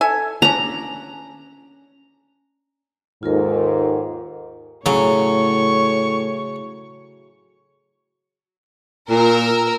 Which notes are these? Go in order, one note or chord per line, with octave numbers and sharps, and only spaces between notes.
A4 E5 G#5
C#4 D4 A#5
D#2 G#2 F4 A4 A#4
A2 C#3 F#3 C#5 C#6
A#2 A#4 E6